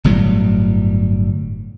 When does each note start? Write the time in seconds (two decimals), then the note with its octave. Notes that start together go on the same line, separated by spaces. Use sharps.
0.04 G1 A2 F#3 G3